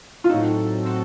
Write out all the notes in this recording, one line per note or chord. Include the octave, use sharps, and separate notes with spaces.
F4
A2 F#3 C4 D#4 F#4 A4
A2 F#3 C4 F#4 A4